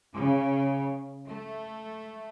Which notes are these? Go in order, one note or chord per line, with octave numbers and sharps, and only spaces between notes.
C#3
A3